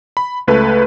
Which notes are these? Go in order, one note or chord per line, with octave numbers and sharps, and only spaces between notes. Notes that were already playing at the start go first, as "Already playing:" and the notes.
B5
C#2 A3 B4